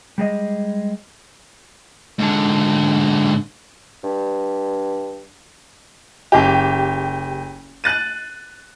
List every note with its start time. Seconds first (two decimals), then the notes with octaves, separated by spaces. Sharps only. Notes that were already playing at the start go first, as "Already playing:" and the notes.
0.18 G3 G#3 D#5
2.19 G#2 D3
4.04 G2
6.32 F#1 G4
7.84 F#6 A6 D#7